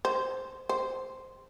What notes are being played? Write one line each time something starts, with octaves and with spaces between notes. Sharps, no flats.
C5
C5